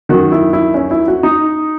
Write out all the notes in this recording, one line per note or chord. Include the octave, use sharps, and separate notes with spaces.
F#2 D#3 F#4
E4
E4
C#4
E4
F#4
D#4